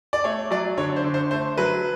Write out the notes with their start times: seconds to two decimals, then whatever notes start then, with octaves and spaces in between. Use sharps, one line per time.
0.13 D5
0.24 A3 C#5
0.51 F#3 D5
0.77 D3 C#5
0.96 C5
1.04 D3
1.14 C5
1.31 A3 C5
1.58 F#3 B4